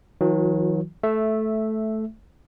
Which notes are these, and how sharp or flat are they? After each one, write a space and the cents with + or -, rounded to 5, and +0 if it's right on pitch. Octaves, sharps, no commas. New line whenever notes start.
D#3 +40 F#3 -30 F4 +45
A3 -10 E5 +0